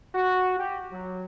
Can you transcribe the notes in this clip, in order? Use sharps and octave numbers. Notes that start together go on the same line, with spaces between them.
F#4
G4
F#3